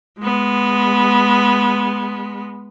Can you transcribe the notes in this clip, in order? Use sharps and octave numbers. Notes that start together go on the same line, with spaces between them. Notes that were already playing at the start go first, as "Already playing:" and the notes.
G#3 B3